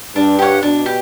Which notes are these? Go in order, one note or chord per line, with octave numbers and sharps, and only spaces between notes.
G2 D4
G4 C#5 F#5
B2 D4
G4